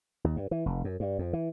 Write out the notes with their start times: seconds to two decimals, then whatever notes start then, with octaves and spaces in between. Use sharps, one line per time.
0.24 D#2
0.37 G2
0.51 E3
0.66 F1
0.84 F#2
1.00 G2
1.19 F2
1.33 E3